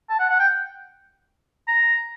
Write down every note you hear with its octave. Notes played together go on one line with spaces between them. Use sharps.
A5
F#5
F#5
G5
A#5